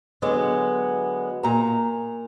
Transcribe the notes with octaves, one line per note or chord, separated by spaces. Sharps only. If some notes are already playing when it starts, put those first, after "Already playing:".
D3 F#3 G#3 B3
A#2 A#5